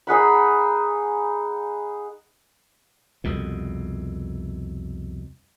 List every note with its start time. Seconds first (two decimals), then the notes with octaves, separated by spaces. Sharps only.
0.07 D#4 G#4 F#5 B5
3.24 C2 F2 B2